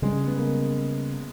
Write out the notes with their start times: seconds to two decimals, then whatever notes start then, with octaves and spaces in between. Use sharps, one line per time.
0.02 C#3 G3 G#3 C#4
0.26 B3
0.38 A#3